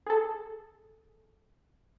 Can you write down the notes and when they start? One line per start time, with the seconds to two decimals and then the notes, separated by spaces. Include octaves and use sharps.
0.06 G#4 A4